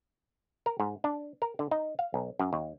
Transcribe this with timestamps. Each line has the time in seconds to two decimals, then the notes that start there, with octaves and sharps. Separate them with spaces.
0.66 A#4
0.80 G#2
1.04 D4
1.42 A#4
1.59 D3
1.71 D#4
1.99 F5
2.14 B1
2.39 F#2
2.53 D#2